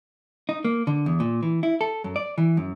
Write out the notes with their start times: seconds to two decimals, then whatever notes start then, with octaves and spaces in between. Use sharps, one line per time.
0.49 D#4
0.65 A#3
0.87 D3
1.06 E2
1.20 A#2
1.43 E3
1.63 E4
1.81 A4
2.04 F#2
2.16 D5
2.38 E3
2.57 F#2